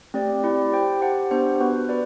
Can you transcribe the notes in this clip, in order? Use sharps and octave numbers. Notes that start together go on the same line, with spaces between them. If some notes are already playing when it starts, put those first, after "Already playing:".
A3 C4 G4 D5
E4 G4 D5
G4 C5 G5
G4 C5 F#5 A5
B3 D4 G4 C5 F#5
B3 F#4 B4
B4 D5